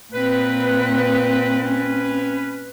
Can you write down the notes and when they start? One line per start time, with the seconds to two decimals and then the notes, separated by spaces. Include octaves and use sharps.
0.13 A#2 C4 B4
1.62 C#4 B4